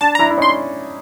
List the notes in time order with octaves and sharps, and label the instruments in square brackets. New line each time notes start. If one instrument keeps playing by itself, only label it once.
[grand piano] D4 [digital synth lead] A5
[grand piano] D4 E4 [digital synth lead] A#5
[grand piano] E4
[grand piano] C#4 D#4 [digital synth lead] C6